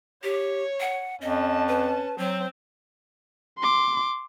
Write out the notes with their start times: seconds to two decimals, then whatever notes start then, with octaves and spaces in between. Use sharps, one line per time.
0.23 G4 C#5
0.80 F#5
1.21 F2 C#4 D#5 A5
1.68 B4
2.18 F#3 C4
3.59 C6 D6